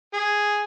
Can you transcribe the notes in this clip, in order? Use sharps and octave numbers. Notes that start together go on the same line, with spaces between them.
G#4